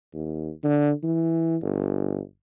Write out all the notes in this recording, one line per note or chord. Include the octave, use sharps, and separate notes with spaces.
D#2
D3
E3
G1